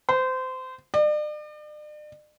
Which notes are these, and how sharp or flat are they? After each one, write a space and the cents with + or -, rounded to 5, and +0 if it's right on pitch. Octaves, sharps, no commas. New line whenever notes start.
C5 -25
D5 +40